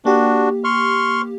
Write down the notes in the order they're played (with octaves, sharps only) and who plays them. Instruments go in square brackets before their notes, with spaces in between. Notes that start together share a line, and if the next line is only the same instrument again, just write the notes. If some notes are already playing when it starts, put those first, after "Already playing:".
[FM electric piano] A#3 G4 [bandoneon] D4 F#4
[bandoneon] C6 C#6 F6